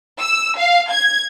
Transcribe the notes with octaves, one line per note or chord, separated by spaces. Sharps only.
E6
F5
G#6